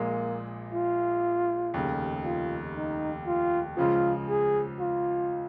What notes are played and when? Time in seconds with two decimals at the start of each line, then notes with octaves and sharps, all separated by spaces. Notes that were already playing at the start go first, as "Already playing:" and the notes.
Already playing: A#1 A#2 G#3 A#3
0.73 F4
1.74 F1 D#2 C#3
2.25 F4
2.76 D#4
3.27 F4
3.77 C#2 C#3 F3 F4
4.28 G#4
4.79 F4